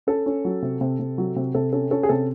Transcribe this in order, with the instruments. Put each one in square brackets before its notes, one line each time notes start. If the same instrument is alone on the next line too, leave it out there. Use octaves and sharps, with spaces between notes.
[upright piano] C#4 A4
C#4
F#3
C3
C3
C3
F#3
C3
C3 A4
C#4 A4
C#4 A4
G#4
C3 A4